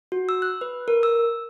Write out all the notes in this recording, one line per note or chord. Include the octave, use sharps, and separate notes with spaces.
F#4
E6
F#6
B4
A#4
E6